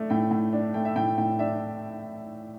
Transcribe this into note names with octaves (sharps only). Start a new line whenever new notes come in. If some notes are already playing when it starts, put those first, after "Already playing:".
Already playing: A3 D4
A2 G5
A2
D4
A3 G5
E5
A2 G5
A2 G5
D4 E5